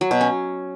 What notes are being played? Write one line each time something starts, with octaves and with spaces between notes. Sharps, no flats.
F#3
B2
C#4